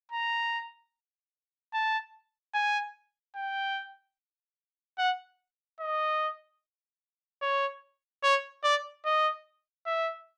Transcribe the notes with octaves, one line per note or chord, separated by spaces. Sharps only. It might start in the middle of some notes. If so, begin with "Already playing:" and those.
A#5
A5
G#5
G5
F#5
D#5
C#5
C#5
D5
D#5
E5